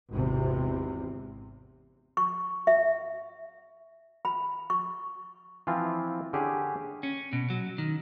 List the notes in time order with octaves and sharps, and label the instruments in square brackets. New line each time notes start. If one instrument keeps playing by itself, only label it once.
[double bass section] G#1 E2 C3
[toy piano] C#6
E5
B5
C#6
[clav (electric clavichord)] E3 F3 C4 F4
D3 C#4 G4 G#4
[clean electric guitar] C#4
B2
F#3
D#3